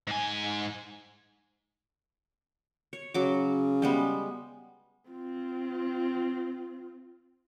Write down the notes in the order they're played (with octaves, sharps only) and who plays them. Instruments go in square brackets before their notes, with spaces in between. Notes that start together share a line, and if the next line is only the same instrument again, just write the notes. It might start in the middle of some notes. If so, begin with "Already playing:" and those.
[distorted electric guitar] G#2 G#5
[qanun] C#5
[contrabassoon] C#3 [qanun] F#3 D6
[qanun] G3 G#3 B3
[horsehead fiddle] C4 F4